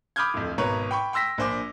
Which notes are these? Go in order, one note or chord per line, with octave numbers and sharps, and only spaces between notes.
B5 D6 D#6 F6 G6 G#6
D1 F2
G#1 B2 B4 C#5 A#5
G5 B5 C#6
G5 C6 E6 A#6 B6
A#1 D4 C5 G#5 D6